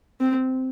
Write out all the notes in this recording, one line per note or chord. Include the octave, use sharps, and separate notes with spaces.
C4